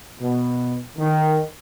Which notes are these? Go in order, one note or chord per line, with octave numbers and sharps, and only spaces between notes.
B2
D#3